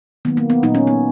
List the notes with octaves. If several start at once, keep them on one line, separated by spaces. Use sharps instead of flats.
D#3 F#3 A#3 B3
A#3
B3
A#2 F#3 A#3 D#4
C#4
B3